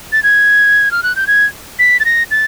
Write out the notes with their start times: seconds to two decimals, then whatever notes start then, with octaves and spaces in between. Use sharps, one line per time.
0.12 A6
0.23 G#6
0.91 F6
1.03 F#6
1.16 G6
1.27 G#6
1.79 B6
2.00 A6
2.05 A#6
2.31 A6